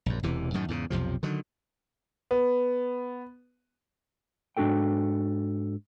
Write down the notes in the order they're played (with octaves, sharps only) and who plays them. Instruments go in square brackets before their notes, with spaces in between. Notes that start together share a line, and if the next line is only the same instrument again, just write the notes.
[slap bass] A#1 F#2
E1 E2 C3 E3
F#2 A2 D#3
E2 G#2 C#3
B1 F2 C3 F3
D3 D#3 F#3
[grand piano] B3
[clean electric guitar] G#2 D4 F#4 A4 G5